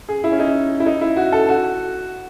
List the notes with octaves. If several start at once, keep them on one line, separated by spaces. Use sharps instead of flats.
G#4
E4
C#4
D#4
E4
D#4
E4
F#4
A4
F#4